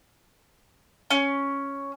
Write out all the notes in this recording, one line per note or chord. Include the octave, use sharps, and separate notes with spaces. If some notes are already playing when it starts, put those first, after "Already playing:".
C#4